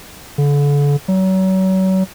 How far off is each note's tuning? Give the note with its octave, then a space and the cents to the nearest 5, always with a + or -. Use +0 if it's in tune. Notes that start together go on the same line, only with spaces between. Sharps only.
D3 -35
F#3 +35